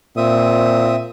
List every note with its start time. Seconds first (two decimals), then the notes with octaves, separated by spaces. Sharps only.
0.17 A#2 C4 E5 D#6